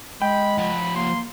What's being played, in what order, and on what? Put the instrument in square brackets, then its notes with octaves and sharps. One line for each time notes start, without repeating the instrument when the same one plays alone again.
[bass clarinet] G#3 [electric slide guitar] G5 [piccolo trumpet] B5
[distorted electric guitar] F3 F#5 [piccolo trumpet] B5
[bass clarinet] A#3 [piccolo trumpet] C6